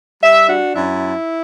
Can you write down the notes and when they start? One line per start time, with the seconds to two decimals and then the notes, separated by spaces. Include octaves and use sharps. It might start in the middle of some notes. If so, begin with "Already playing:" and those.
0.22 G3 E5
0.48 D4 F#4
0.75 F#2 E4